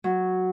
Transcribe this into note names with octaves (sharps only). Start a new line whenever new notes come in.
F#3